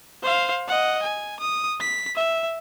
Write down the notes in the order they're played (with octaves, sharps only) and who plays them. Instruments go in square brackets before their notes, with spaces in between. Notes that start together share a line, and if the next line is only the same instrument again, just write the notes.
[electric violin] C5 F5
D#5 F#5
G#5
D#6
B6
E5